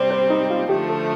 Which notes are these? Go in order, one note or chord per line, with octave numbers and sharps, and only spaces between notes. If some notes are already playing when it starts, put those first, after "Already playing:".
Already playing: C3 G3 C4 C5 D5
C5
D#4
F4
D3 F3 A3 G4
A4